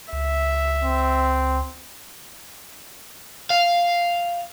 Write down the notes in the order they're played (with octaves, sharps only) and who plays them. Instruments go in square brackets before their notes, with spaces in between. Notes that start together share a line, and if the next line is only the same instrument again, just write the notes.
[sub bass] C#2 [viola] E5
[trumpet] C4
[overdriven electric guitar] F5